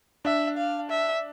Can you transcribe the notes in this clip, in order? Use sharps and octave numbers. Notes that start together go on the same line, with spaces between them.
D4 E5
F5
E5